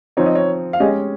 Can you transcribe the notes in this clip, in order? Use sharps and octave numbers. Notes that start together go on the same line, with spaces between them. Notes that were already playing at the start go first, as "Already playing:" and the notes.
F3 C4 D#4 C#5
D#5
C#5
F5
G#3 C#4 G4 D#5